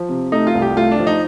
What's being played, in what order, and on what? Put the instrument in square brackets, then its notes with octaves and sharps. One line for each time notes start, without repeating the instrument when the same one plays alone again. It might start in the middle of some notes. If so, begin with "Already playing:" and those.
Already playing: [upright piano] F3
C3
[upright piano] A3 [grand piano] D#4
[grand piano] F4
[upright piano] C2
[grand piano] G4
[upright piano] A3 [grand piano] F4
[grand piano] D4
[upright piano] F3
[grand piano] D#4